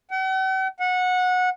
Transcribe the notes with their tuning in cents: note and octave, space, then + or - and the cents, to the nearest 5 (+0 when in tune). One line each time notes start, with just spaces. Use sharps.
F#5 +45
F#5 -20